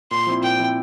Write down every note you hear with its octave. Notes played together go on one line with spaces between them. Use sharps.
A#2 C6
F3 C4 E4
A#2 G5
F3 C4 E4